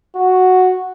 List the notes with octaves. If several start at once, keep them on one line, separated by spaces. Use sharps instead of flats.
F#4